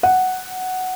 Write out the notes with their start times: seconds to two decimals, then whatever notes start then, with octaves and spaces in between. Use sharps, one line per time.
0.03 F#5